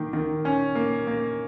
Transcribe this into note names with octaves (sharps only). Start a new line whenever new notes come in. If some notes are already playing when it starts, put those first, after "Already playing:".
Already playing: D#3 A#3
D#3
C#4
A#3
A#3